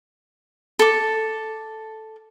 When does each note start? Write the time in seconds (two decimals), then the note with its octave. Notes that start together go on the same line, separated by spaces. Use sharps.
0.79 A4 D6